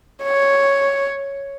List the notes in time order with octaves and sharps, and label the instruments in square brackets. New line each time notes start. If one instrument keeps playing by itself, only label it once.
[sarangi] C#5